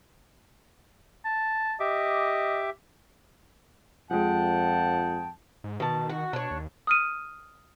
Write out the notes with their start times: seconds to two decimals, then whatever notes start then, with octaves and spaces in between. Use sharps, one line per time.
1.25 A5
1.80 G4 D#5 E5 D6
4.11 F2 F3 G#3 F#5 G5 A5
5.64 G#2
5.80 B2 D#3 A5
6.10 F#4
6.33 B2 D4 C#5
6.51 D#2
6.87 D#6 F6 D#7